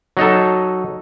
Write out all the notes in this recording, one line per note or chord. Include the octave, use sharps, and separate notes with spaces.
F#3 D#4 A4